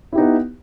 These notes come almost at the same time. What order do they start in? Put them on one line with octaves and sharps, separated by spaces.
E4 G4 D#4 B3